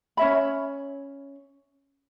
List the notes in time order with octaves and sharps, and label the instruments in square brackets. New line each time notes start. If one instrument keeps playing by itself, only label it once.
[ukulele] C#4 C#5 E5 B5